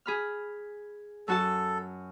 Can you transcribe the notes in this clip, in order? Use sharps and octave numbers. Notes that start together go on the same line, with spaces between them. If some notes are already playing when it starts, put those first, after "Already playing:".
G#4 B5 F6
F#2 F#4 A4 A5